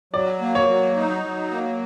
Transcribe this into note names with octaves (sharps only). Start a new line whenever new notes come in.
F#3 D5
A#3
C#5
F#3
D#4
F#3
A#3